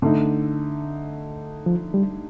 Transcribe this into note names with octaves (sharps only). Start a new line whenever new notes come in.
D3 A3 D#4
F3
G3